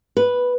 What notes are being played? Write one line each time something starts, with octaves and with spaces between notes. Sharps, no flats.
B4